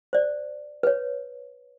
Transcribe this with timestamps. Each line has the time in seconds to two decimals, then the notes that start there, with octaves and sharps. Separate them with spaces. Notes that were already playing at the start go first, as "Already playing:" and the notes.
0.13 C5 D5
0.83 B4 C#5